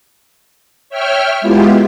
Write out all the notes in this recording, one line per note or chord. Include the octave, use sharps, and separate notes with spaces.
C#5 E5 G5 F6
G#3 B3 E4 F4 G4